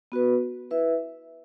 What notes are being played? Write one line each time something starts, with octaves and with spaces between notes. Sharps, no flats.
B3 F#4 B4
E4 B4 E5